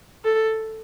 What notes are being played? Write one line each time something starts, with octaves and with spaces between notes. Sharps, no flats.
A4